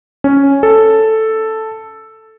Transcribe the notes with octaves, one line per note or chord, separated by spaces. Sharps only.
C#4
A4